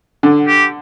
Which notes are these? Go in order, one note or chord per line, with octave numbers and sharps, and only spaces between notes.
D3
G4